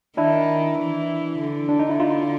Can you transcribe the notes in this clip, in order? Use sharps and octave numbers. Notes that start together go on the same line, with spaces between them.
D#3 D4 E4
E3
D3
D4
D#4
E4
D#4 F4